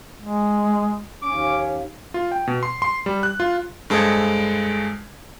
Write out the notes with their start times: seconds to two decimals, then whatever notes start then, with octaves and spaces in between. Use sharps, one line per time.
0.21 G#3
1.23 D#2 C#4 D6
2.14 F4
2.32 G5
2.47 B2
2.63 C6
2.82 C6
3.06 G3
3.23 F#6
3.40 F4
3.90 G2 G#3 A4 C5 D#5 G#6